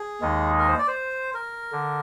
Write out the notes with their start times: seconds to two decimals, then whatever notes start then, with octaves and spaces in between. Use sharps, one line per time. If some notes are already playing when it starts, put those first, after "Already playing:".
Already playing: G#4
0.21 D#2 D#3 G#3 D#4
0.59 A#4
0.68 C5
0.78 D5
0.88 C5
1.34 A#4
1.72 D3